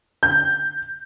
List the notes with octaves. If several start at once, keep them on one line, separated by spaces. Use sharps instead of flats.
G6